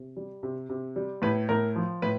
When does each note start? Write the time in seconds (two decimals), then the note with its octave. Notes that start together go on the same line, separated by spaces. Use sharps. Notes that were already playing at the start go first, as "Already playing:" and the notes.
Already playing: C3
0.17 G3
0.43 C3
0.69 C3
0.96 G3
1.22 A2 B4
1.49 A2 A#4
1.76 F3
2.02 A2 B4